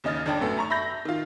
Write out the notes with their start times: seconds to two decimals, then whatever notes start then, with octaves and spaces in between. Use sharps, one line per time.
0.04 D#2 C#3 D#5 F6 A6
0.26 G1 D4 G5 A5
0.41 F#2 A3 B3
0.57 A5 A#5 C#6
0.70 E5 B5 G6 A#6
1.05 D#3 F4